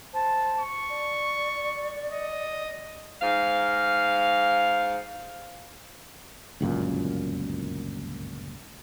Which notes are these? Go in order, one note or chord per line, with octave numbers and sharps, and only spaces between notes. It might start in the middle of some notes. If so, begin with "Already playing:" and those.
C5 A5
C#6
D5
D#5
G#2 F5
G1 C#2 F#2 A#2